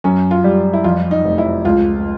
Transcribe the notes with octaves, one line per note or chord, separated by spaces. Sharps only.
F#2 C#4
F4
G3
E4
F2 F4
D#4
F1
E4
C#2 F4